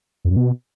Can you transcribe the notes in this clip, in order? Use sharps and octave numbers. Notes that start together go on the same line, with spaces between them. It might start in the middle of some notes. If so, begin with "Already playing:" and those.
F2
F#2
B2